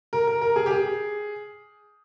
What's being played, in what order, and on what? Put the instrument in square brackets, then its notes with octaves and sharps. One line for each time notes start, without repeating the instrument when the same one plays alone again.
[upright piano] A#4
A#4
A#4
G#4
G4
G#4